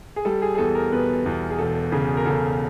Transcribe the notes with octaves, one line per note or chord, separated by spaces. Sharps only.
G#4
G3 A4
G#4
G#4
E2 A4
A#4
B2 B4
E2
G#4
E1 A4
C#3 G#4
A#4
C#3 A4